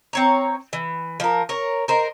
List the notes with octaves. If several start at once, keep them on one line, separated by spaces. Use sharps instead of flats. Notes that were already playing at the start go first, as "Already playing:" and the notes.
C4 C#5 A#5
E3
F3 A#4
A#4 C#5
A#4 C5 D#5